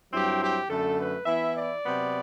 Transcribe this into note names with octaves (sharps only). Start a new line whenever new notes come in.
G2 F#3 C4 E4 G4
G4
F#2 D3 A3 A4
B4
E3 B3 E4 E5
D5
C3 F#3 B3